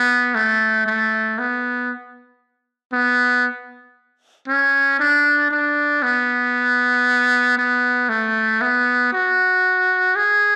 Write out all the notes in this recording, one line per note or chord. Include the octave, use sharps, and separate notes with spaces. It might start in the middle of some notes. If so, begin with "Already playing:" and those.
Already playing: B3
A3
A3
B3
B3
C#4
D4
D4
B3
B3
A3
B3
F#4
G#4